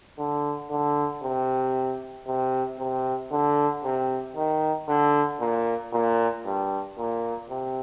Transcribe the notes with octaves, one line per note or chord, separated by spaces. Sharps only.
D3
D3
C3
C3
C3
D3
C3
D#3
D3
A#2
A#2
G2
A#2
C3